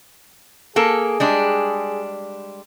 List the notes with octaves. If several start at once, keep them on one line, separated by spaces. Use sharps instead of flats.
A#3 G#4 A4
G3 G#3 D4